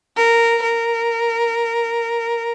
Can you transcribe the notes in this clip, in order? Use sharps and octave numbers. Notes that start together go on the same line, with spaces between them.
A#4
A#4